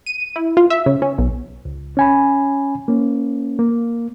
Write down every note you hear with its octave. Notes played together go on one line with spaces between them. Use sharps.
D#7
E4
F4
E5
C#3
C#4
B1
C#2
C#4 G#5 B5
A#3 C#4
A#3